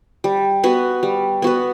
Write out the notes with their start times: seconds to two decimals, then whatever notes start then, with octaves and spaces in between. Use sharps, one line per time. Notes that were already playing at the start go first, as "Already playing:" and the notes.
0.24 G3
0.63 B3 F#4 B4
1.03 G3
1.42 B3 F#4 B4